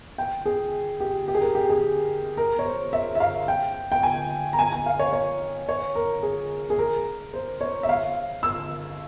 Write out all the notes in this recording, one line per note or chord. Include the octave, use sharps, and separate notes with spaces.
G5
G#4
G4
G4
G#4
A#4
G4
G#4
A#4
C#5
C5
E5
E5
F5
G5
G5
G#5
A#5
G#5
G#5
F5
C#5
C#5
C#5
A#4
G#4
G#4
A#4
C5
C#5
E5
F5
E6